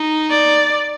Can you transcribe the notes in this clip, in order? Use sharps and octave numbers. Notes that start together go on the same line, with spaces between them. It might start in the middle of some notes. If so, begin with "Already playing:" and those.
Already playing: D#4
D5